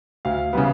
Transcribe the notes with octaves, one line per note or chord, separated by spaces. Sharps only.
D2 F5
C#3 E3 G3 B3